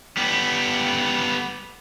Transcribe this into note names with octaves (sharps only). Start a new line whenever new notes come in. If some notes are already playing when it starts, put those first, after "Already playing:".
G3 B3